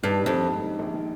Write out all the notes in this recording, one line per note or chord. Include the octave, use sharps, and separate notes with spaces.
G2 D#3
G3
F2
A#1
G#2
D#3
A#1
D#3